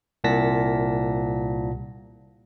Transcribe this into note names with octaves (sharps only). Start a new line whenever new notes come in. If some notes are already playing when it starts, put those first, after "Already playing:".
C2 A#2 F#5 A5 A#6 B6